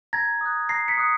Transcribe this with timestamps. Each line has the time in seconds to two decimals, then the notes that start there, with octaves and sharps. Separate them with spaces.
0.13 A#5 G#6 A#6
0.41 D#6 F#6
0.69 A#5 A#6 C7
0.88 B6 C#7
0.98 D#6 F#6